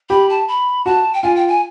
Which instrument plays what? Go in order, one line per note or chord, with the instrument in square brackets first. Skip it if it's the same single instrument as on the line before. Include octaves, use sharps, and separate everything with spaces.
[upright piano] G4 [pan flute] B5
[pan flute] A5
B5
[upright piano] F#4 [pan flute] A5
[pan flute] G5
[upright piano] F4 [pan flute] G#5
[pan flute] G5
G#5